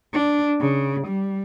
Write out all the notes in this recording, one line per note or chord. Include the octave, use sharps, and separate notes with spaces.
D4
C#3
G3